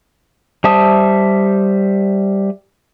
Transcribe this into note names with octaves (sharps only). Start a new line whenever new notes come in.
G3 C5 E5 A5 D#6